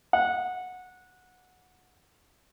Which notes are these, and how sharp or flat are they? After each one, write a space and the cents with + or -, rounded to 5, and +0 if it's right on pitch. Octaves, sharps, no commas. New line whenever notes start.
F#5 -15